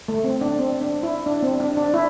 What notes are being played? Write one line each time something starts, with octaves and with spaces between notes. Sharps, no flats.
A3
C4
D4
C4
D4
E4
D4
C4
D4
D4
E4